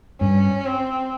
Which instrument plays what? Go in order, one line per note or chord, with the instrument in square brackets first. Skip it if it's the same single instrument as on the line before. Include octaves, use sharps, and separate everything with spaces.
[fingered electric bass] G2 [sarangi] C#4
[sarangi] C4